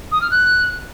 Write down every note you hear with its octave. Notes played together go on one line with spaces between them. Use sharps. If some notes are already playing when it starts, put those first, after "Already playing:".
D#6
F6
F#6